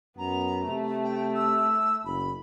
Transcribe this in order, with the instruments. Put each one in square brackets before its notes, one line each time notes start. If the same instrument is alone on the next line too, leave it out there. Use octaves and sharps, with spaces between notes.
[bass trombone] F#2 [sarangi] B3 [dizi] A#5
[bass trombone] C3 [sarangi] A3
[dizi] G5
E6
[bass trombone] F#1 [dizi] B5